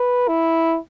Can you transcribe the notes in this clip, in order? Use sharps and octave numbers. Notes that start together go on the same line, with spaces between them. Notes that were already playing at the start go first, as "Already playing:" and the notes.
Already playing: B4
E4